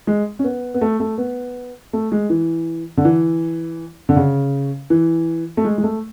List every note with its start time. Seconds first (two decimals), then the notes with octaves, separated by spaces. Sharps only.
0.07 G#3
0.39 C#4
0.44 B3
0.74 B3
0.81 A3
1.00 A3
1.18 B3
1.93 A3
2.12 G#3
2.30 E3
2.97 D3
3.05 E3
4.09 D3
4.16 C#3
4.90 E3
5.57 A3
5.65 G#3
5.78 G#3
5.83 A3